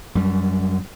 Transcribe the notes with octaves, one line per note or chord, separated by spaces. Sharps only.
F#2 G3